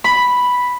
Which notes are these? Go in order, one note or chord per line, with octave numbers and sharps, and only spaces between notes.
B5